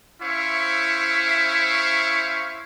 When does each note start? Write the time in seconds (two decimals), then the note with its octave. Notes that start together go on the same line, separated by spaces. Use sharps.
0.22 C#4 E4 C5 E5 F5 C#6